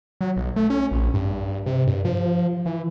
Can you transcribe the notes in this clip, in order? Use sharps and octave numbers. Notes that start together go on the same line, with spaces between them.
F#3
B1
A3
C#4
A#1
G2
C3
G2
F3
E3